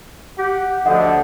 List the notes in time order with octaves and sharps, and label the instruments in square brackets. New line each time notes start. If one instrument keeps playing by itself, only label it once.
[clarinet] G4 [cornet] F#5
[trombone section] D2 D3 [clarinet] F3 [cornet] D#5 [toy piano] F#5